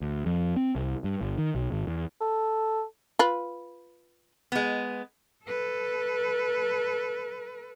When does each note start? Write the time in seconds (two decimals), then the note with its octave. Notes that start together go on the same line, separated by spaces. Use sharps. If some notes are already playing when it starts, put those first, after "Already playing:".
0.02 D2
0.26 F2
0.56 C4
0.75 C2
1.04 G2
1.21 G1
1.38 D#3
1.55 B1
1.72 G#1
1.87 E2
2.21 A4
3.19 F4 B4
4.52 G#3 B3
5.44 A4 B4